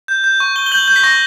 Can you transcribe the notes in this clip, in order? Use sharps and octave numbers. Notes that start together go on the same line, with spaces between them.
G6
G6
C#6
C#6 G7
G7
G6 F#7
G6
B6
C#6 A#6